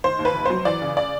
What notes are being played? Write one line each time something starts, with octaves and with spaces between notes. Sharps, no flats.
D#3 C5
D#2
B4
F1
F#3 C5
E3 D5
C#3
D5